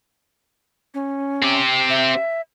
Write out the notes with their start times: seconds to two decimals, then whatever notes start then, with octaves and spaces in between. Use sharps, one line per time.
0.94 C#4
1.43 C4 G4
1.90 E5